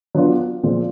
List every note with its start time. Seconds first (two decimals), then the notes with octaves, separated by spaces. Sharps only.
0.15 F#3 B3 D4 F4
0.63 A#2 F3 G#3 C4